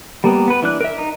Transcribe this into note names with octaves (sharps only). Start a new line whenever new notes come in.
G3 A#3 B3
B3 B4
E3 D4 F#6
A#4 E5
D#4